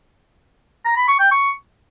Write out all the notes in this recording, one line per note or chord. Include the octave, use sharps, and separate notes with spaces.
A#5
B5
C#6
G5
C#6